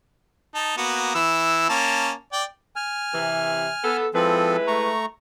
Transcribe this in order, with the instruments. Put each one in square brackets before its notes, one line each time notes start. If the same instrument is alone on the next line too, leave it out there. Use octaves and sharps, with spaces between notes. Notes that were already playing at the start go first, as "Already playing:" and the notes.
[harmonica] D#4 A5
A#3 B3 F#4
E3 E6
A#3 C#4 A5
D5 G5
[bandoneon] G#5 F6
[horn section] C3 E3
B3 A4
[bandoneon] F3 C4 A4 [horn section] G#3 E4 B4
[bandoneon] A3 A#5 C#6